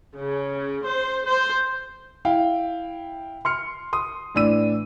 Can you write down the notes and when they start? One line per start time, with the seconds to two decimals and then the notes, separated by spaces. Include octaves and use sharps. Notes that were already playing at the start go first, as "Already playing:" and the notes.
0.18 C#3
0.87 C5
1.26 C5
2.25 E4 F5 G5
3.45 C6 F6 C#7
3.93 C6 D#6
4.35 A2 E3 D4 E6 D#7